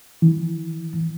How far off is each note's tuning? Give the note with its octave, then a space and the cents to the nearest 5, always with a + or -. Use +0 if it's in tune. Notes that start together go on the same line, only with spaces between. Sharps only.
E3 -10